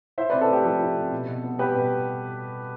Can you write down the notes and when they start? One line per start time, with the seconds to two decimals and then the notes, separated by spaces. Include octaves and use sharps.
0.18 E4 C5 E5
0.30 C3 B4 D5
0.41 A4
0.48 A3 G4
0.64 F3 A4
0.81 E4
0.96 C3
1.12 B2
1.27 B2
1.44 B3
1.58 G3 G4 B4
1.75 B2